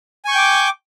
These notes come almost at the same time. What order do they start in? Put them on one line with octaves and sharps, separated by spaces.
G#5 C#6 G6 G5 D6